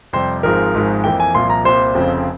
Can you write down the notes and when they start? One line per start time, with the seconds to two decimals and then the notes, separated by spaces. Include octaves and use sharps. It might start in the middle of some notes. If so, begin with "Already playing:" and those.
0.13 F2 C3 G3 C5
0.43 G#1 G#2 F3 G#3 A#4
0.74 G#1 G#2 F3 G#3
1.04 F2 E3 A#3 G5
1.20 G#5
1.34 C2 A#2 F3 C6
1.50 A#5
1.64 C2 A#2 G3 C5
1.95 F1 F2 C#3 F3 C4